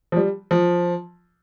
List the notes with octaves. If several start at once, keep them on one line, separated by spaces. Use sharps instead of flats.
F3
G3
F3